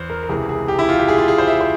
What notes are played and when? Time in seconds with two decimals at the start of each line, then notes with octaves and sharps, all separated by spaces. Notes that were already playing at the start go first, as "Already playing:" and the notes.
Already playing: E2 C5
0.10 A#4
0.23 A#4
0.29 C#2 C3 E3 G#4
0.49 G#4
0.68 G4
0.79 E4
0.89 F4
0.99 G4
1.09 G#4
1.18 F4
1.28 G#4
1.38 C5
1.48 E5
1.61 C5